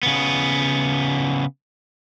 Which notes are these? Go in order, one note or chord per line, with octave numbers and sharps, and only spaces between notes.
C#3 B3